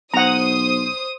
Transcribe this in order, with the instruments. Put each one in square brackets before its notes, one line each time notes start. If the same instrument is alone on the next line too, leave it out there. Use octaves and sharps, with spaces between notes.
[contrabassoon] B1 [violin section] C5 D#6 [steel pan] F#5 A#5